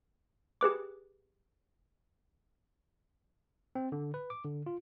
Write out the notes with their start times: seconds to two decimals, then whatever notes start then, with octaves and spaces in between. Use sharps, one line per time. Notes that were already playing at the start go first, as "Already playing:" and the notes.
0.61 G4 G#4 B4 D6
3.75 C4
3.92 D3
4.14 B4
4.30 D6
4.44 D3
4.66 F4